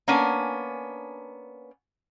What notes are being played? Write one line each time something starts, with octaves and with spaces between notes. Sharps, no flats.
A#3 B3 C#4 D4 G#5